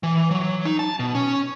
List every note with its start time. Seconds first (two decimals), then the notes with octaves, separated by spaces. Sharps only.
0.03 E3
0.31 F#3
0.65 D#4
0.79 A5
0.99 B2
1.15 C#4